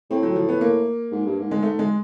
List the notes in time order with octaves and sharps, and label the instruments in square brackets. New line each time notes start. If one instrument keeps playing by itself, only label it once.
[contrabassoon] A2 [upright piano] C4
[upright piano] F#3
F3
B3
A#3
[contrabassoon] G#2
G2
G#2
[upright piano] G#3
A3
G#3